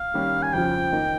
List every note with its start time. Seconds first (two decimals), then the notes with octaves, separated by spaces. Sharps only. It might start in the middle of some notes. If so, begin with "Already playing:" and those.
Already playing: F5
0.14 D#3 G3 A#3 C#4
0.43 G#5
0.54 F2 C#3 F3 G5
0.92 D#3 A#3 D#4